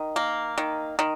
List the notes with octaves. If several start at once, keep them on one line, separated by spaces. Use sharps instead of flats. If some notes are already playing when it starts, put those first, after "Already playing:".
Already playing: D#3
A#3
D#3
D#3